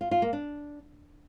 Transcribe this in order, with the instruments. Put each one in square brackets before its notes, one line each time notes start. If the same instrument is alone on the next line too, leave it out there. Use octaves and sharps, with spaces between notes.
[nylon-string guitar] F4
F4
A#3
D4